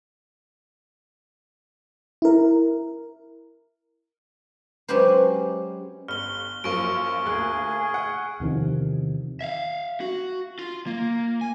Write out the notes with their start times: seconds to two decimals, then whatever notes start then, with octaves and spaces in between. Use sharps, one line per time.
2.22 E4 A#4
4.88 F#3 G#3 C#4 G4 B4 C5
6.08 G1 F6 G7
6.64 F#2 F3 A#3 C#6 D7
7.26 D2 A#3 G#4 F#6
7.94 F#5
8.40 E2 C3 D#3 F3
9.41 E5 F5
10.01 F#4
10.59 F4
10.87 A#3
11.41 G#5